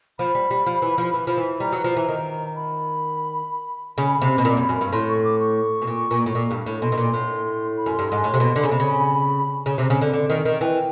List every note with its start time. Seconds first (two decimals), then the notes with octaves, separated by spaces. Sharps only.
0.19 F3 B5
0.35 G3
0.51 G3
0.66 F3
0.82 E3
0.98 F3
1.14 E3
1.27 F3
1.37 E3
1.60 G3 A#5
1.72 F#3
1.84 F3
1.97 E3
2.09 D#3
2.56 B5
3.98 C#3 B5
4.22 C3
4.38 B2
4.45 A#2
4.57 F#2
4.69 F#2
4.81 G2
4.92 A2 C6
5.08 C#6
5.24 D6
5.40 C#6
5.82 B2
5.87 A#2
6.11 A#2
6.26 A2
6.35 A#2
6.51 G2
6.66 A2
6.82 B2 C6
6.92 B2
6.97 A#2
7.14 A2
7.77 B5
7.86 F#2
7.92 C6
7.99 G2
8.08 G#2 C6
8.24 A2
8.34 C3
8.40 B2
8.56 D3
8.63 C#3
8.71 C3 B5
8.80 C#3
9.66 C#3
9.78 C3
9.90 C#3
10.02 D3
10.14 D3
10.30 D#3
10.45 D#3
10.61 E3 G5